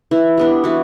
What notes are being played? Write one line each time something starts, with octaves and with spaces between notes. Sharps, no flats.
E3 E4
G3 B3 D4
E3 F#4